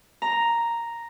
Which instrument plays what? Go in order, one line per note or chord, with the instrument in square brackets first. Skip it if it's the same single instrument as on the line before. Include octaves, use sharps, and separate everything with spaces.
[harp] A#5